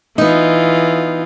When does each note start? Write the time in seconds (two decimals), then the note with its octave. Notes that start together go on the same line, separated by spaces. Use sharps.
0.18 E3 B3 D#4 F4